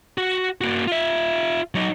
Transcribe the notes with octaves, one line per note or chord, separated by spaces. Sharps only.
F#4
A#3 F#4
F4 E5
F#3 D#4